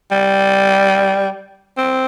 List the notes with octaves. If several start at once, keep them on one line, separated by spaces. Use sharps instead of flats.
G3
C4